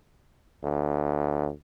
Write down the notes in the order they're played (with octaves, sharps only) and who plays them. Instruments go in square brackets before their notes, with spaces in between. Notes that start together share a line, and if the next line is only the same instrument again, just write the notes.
[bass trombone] D2